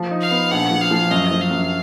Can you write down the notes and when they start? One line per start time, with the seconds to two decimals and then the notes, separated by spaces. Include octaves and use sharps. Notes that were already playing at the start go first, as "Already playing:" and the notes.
Already playing: F3
0.11 D#4
0.21 F5
0.31 B3
0.51 A#1 F#5
0.71 F3
0.81 F5
0.91 F3
1.11 F#2 D#5
1.31 F3
1.41 F5
1.51 F#2